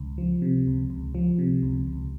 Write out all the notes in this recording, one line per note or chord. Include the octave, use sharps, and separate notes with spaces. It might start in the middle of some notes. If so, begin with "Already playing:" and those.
Already playing: C#2
F3
C3
C#2
C#2
F3
C3
C#2
C#2